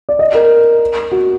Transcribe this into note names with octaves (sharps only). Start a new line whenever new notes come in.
D5
D#5
A#4
F#4